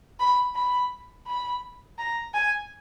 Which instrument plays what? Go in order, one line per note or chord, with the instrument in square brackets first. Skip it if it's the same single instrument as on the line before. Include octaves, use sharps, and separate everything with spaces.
[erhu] B5
B5
B5
A#5
G#5